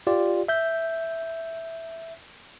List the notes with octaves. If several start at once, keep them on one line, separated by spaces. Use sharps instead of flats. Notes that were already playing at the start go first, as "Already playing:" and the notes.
F4 G4 D5
E5 G6